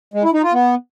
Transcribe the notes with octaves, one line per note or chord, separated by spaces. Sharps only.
G#3
E4
D#4
F4
B3